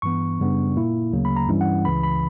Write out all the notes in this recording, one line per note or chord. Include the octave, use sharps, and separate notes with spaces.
G2 E3 B3 C#6
F#2 C#3 G3 B3 D4
A#2 A#3 E4
D2 C#3 F#3 A#3
B5
A#5
G2 E3 G3 C#4 E4
F#5
C#2 C#3 E3 B5
B5